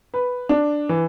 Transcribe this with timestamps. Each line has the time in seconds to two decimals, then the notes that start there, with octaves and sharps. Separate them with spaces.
0.14 B4
0.49 D4
0.89 E3